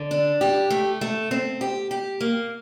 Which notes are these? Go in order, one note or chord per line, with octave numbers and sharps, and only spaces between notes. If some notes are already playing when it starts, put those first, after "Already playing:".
Already playing: D3
D4
G4
A3
A3
C4
G4
G4
A#3